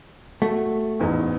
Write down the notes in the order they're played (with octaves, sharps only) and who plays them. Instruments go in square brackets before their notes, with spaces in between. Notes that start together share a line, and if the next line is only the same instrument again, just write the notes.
[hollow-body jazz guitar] A3 [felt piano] F#4
[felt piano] A1 E2 G#2